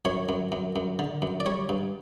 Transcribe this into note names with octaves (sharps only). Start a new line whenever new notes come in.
F#2 C#5
F#2
F#2
F#2
D3
F#2
D5
G3 C#5
G2